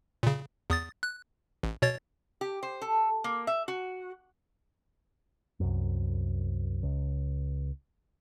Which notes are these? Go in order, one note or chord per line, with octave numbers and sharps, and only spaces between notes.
A#2 C#3
E2 D#6 A6
F#6
A1
B2 C#5 A6
G4
C5
A4
A#3
E5
F#4
C2 F#2
C#2